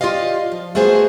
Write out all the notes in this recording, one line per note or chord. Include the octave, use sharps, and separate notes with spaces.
F4 G4 D5 D#5 F5
F3
A3 B3 F#4 G#4 B4 C5